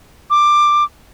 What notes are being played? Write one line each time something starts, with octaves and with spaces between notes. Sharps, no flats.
D6